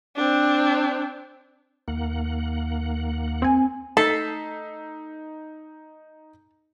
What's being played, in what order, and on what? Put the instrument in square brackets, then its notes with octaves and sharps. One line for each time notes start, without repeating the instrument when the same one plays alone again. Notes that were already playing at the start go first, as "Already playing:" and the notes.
[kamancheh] C4 D4
[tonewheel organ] D#2 A#3 F#5
[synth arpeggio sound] C4 G#5
[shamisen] A3 [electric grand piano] D#4 B6 C7 [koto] A4